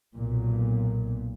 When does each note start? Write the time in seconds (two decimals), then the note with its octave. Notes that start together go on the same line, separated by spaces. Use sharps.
0.16 B1 A#2